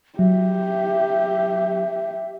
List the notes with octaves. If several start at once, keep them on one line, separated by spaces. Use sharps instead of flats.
F#3 G4 E5